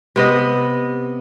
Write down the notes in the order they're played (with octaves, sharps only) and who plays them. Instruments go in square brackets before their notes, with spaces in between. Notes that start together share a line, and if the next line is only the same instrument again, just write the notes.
[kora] C3 B3 D#5